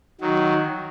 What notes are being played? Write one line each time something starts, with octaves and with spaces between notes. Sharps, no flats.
D#3 F#3